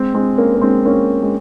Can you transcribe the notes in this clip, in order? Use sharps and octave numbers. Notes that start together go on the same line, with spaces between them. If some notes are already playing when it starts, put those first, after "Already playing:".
Already playing: G#3 C4
G#3 C4
A#3 C#4
A#3
G#3 C4
A#3 C#4
G#3